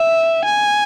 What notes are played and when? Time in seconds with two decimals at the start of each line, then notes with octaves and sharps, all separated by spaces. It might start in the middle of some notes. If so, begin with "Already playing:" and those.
Already playing: E5
0.45 G#5